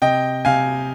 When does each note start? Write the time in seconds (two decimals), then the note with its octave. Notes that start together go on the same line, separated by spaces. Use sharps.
0.02 C3 D#5 G5
0.45 C3 F5 G#5